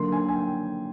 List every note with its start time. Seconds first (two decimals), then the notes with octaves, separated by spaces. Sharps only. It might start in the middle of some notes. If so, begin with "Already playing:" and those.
Already playing: D3 F#3 A#3 D#4 C6
0.12 G#5
0.29 G#5
0.35 G5